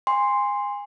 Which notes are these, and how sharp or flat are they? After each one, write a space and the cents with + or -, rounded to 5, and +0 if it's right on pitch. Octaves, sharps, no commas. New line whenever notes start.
G#5 -25 C6 +0